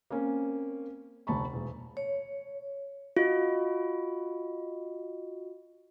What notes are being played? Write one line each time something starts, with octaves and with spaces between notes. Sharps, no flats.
A#3 C4 C#4
F1 D2 A5 B5 C#6
E1
C#5
F4 F#4 D#5